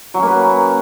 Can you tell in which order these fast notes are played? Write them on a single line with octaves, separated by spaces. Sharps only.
F#3 C#4 A#3 B4